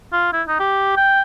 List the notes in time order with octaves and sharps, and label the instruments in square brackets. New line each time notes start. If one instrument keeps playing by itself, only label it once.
[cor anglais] F4
E4
D#4
G4
G5